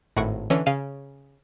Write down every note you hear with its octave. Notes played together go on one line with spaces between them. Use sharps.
G#1 A2 F#5 C#6 D7
D3 E3 C#4
C#3 F5 F6 D#7